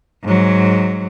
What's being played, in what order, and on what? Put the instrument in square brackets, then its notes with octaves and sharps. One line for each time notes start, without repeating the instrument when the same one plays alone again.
[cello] G#2 F#3